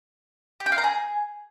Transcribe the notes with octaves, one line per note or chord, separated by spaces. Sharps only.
G4
G5
F5
A#5
G#4